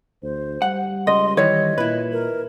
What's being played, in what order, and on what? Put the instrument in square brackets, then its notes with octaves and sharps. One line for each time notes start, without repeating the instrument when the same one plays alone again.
[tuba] D2 [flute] C5
[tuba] G3 [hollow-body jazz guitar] F#5
[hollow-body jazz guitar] C#2 [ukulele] D#5 [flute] C6
[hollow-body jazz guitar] D#3 E3 [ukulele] C#5 [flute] D#5
[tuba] A#2 [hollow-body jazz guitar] E4 B4
[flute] A#4